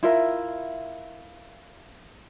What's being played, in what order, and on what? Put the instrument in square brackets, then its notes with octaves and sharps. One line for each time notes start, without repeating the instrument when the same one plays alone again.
[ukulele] E4 F4 A#4 E5